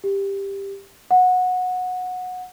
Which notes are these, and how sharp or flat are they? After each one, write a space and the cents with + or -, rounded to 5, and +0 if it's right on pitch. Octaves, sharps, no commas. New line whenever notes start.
G4 +10
F#5 -15